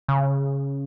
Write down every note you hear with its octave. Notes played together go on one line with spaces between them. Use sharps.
C#3